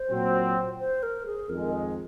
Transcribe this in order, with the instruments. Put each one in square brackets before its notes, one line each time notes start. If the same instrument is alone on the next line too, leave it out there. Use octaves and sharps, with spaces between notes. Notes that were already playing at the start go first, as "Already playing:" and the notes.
Already playing: [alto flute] C5
[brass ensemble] A#2 F#3 C4
[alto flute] C5
A#4
G#4
[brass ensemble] F2 D#3 G#3 [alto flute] A#4
[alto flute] G#4